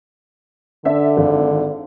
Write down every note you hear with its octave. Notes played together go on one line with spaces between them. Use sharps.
D3 D4 E5
G#1